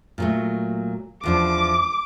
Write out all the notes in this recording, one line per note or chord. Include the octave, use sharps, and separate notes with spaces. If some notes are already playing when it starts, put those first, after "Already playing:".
A#2 F#3 A3
E2 F3 D4 D6